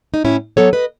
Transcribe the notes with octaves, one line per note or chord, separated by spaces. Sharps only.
D#4
A2 C#4 E4
F#3 B3 A4 C#5
B4 D#5